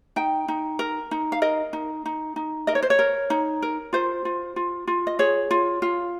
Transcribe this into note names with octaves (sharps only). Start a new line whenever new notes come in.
D#4 G5
D#4
A#4
D#4
F5
A#4 D#5
D#4
D#4
D#4
A#4 D#5
C#5
C5
C#5
A#4
D#4
A#4
F4 C5
F4
F4
F4
D#5
G#4 C#5
F4
F4